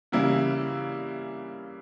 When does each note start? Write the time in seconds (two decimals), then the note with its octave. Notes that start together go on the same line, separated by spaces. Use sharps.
0.12 C#3 E3 G3 A#3 E4